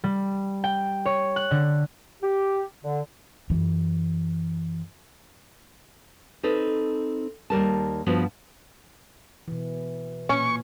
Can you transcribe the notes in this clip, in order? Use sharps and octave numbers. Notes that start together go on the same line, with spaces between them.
G3
G5
C#5
F#6
D3
G4
D3
F#2 E3
C4 D#4 A4 B4
D#2 G3 A#4 A5
G2 F3 B3 F#4 C5
B2 E3
A#2 C#4 C#6